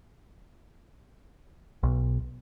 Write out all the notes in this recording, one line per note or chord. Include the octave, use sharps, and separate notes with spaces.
B1